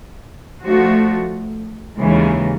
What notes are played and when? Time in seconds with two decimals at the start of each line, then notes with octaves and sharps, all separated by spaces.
0.65 F3 A3 D4 F#4
1.97 D#2 C#3 E3 G#3